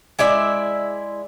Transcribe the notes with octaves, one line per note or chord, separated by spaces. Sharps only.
G#3 E4 D5 E5